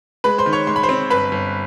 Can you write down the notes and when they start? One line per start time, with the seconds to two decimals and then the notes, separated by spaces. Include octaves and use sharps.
0.24 G#3 B4 B5
0.38 C5 C6
0.46 D#3
0.53 C#5 C#6
0.67 G#3 C6
0.76 B5
0.83 C5 C6
0.89 C4
1.10 G1 B4 B5
1.32 G1